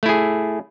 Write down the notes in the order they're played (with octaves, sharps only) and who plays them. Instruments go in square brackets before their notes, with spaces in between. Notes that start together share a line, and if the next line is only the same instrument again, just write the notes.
[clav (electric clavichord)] A3
E4
G#4